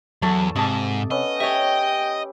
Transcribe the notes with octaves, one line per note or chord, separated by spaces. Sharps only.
E2 F#3 A3 A5
G#2 C3 D#5 A5 D6
B3 C#4 D#5 E5
G4 C#5 E5 G5